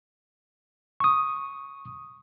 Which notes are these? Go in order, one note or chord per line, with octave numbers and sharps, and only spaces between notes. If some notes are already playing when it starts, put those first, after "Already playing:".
C#6 D#6